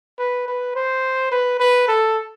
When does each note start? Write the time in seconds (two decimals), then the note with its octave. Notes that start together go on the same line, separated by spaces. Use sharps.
0.19 B4
0.48 B4
0.76 C5
1.32 B4
1.60 B4
1.88 A4